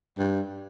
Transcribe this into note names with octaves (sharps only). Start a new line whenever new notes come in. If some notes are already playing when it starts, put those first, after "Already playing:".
G2